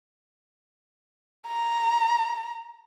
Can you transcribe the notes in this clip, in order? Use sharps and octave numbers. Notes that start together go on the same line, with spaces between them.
A#5